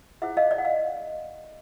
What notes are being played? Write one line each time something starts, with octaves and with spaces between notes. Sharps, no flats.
E4 G#4 C5 E5 F#5
D#5 F5
D5 E5
F#5
D#5 F5